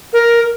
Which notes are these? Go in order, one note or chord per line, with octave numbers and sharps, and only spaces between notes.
A#4